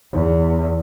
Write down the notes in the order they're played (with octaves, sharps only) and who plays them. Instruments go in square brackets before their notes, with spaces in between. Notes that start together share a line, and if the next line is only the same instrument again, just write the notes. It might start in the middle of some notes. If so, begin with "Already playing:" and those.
[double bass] E2